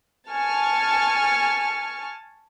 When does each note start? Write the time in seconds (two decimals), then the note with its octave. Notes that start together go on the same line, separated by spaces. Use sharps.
0.31 G#5 A5 C#6 F6